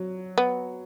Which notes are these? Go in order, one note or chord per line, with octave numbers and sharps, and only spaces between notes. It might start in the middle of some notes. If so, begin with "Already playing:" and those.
Already playing: F#3
B3